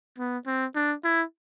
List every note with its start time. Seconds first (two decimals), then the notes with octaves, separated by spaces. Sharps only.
0.18 B3
0.46 C4
0.75 D4
1.04 E4